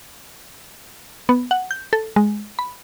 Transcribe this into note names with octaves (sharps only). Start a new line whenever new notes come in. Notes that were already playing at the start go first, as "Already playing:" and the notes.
B3
F#5
G6
A4
G#3
B5